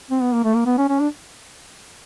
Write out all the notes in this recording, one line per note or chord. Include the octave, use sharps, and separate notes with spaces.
C4
B3
A#3
A3
A#3
B3
C#4
C#4
D4